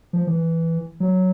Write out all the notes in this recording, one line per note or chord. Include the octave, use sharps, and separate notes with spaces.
F3
E3
F#3